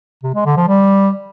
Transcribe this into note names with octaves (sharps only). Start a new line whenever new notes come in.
C3
G#3
D3
F3
G3